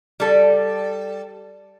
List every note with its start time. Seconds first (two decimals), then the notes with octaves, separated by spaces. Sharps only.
0.20 G3 A4